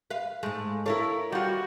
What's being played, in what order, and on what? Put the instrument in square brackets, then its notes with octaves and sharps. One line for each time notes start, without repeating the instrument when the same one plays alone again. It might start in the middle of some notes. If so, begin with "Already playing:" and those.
[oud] B4 F5
[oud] G#2 G#3 [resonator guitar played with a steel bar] A3
[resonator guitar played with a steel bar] E4 A#4 C#5 [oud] A4 F5
[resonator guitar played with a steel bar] G3 F4 [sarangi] F#4